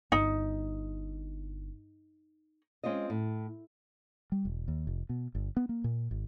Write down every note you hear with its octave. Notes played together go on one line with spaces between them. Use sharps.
G1 D#4
G#3 C4 C#4 F4 D#5
A2
G3
E1
D#2
F1
B2
G1
B3
A#3
A#2
G#1